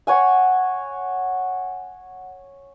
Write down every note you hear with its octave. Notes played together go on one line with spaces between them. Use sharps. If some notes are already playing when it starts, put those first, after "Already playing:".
C#5 F#5 G#5